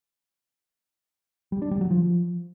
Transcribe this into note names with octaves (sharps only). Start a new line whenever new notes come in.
G3
D4
G3
F#3
F3